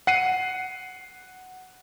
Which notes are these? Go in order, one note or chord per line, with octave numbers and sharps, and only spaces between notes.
F#5 C7 D#7